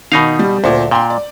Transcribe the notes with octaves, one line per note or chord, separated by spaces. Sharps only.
B2 D#3 D#4 F5
G3
D2 A#2 C5
A#2 G5 C6
D5